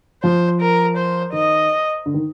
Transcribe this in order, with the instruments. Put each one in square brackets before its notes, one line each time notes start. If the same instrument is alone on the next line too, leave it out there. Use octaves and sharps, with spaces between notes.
[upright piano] F3 [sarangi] C5
[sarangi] A#4
C5
[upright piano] D#3 [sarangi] D#5
[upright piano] D3
D#3